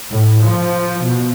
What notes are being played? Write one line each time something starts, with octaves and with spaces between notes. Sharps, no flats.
A2
F3
B2